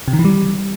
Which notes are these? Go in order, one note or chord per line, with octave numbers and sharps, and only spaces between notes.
C3
D#3
E3
G3